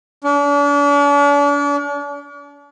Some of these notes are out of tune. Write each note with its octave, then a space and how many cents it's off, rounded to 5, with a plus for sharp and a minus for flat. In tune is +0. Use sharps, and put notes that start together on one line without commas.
D4 -40